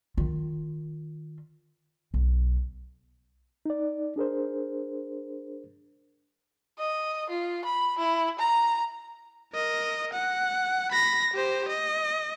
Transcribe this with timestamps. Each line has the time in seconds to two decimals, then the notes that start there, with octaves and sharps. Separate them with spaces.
0.17 D#3 F4
2.14 B1
3.66 D#4 D5
4.16 D4 G#4 A#4 C5
6.78 D#5
7.29 F4
7.64 B5
7.98 E4
8.38 A#5
9.54 A#4 D#5
10.13 F#5
10.92 B5 A#6
11.34 G4 C5
11.69 D#5